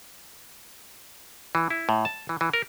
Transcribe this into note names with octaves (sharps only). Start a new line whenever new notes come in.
E3
E4
A2
A5
E3
E3
A#4